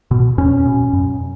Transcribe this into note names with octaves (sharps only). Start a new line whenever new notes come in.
B2
E2 C#4
B2
F#2